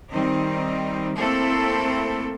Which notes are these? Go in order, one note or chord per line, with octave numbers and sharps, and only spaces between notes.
D#3 G3 C4 D#4
A3 A#3 C4 E4 A4